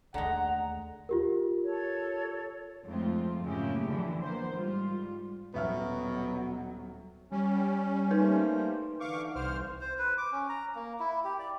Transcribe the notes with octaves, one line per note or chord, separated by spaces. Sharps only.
D#2 D3 G#3 A3 F#5 A#5
F4 G4 A#4
A4 C#5
F2 G#2 A3 C4 F4
F#2 A2 C#3 A#3 E4 G4
D3 E3 F3 D4
A#3 B3 C5
G#2 G3 F4
D#1 B2 F#3 B3 E5 F6
G3 C#4
A3 A#3 D#4 B4 C5 G6
D3 E3 F5 C#6 D6
C2 E3 C5 F6
C5
B4
D6
C#4
A#5
A#3
E4
G4
D5